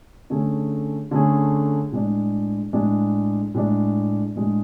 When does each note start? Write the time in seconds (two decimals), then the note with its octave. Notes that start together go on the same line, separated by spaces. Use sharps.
0.30 D3 A3 C#4 G#4
1.11 D3 A3 C#4 G#4
1.92 A2 G#3 D4
2.73 A2 G#3 D4
3.54 A2 G#3 D4
4.36 A2 G#3 D4